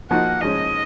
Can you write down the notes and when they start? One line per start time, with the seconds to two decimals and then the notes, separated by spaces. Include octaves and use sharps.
0.11 F3 A#3 D#4 F#4 F#5
0.41 G#2 F3 G#3 C#4 D#5